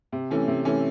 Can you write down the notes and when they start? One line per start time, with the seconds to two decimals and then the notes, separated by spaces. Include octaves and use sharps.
0.12 C3
0.30 E3 A3 C#4
0.48 C3
0.65 E3 A3 C#4